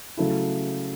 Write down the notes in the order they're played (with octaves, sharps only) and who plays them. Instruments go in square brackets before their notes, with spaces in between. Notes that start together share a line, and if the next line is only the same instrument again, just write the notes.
[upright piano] C#3 F#3 A3 E4